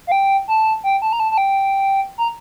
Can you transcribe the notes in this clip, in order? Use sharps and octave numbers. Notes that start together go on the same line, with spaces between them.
F5
G5
A5
G5
A5
A#5
A5
A5
G5
A#5